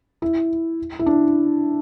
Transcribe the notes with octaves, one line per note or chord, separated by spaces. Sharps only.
E4
E4
D4